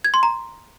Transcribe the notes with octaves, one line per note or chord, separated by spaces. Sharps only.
G#6
C6
A#5